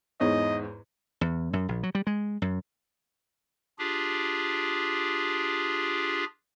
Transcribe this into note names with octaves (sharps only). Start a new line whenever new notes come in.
E2 G#2 C#5 D#5
E2
F#2
A#1
F#3
G3
G#3
F#2
D4 F4 G4 G#4